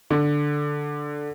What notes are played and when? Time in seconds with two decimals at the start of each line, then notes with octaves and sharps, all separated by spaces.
0.10 D3